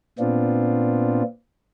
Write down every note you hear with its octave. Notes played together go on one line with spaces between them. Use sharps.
A#2 B3 C4 D4 F4